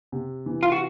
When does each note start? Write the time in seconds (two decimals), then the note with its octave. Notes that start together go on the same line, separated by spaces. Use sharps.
0.12 C3
0.46 E3
0.63 F4
0.72 F#4